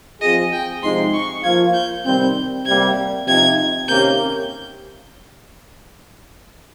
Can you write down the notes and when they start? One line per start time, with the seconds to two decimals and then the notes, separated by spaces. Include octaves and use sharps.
0.21 F3 C4 F4 G#4 D#5
0.52 G5
0.83 C3 F3 G#3 D#4 C6
1.13 C#6
1.43 F3 A#3 F4 G#6
1.74 G6
2.05 C3 D#3 G3 C4 G6
2.66 C3 G3 A#3 G#6
3.27 C3 F3 C4 D#4 G#6
3.88 C3 D#3 A#3 C#4 G4 G6